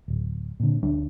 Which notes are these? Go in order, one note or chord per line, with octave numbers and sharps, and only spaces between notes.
D1
A#2 D3
D2 G3 D4